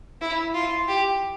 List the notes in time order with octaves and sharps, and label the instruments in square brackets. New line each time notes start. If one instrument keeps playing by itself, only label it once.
[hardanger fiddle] E4
F4
G4